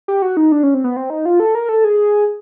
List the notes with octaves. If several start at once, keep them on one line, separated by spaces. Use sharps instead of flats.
G4
F#4
D#4
D4
C#4
C4
B3
C4
D#4
F4
A4
A#4
A4
G#4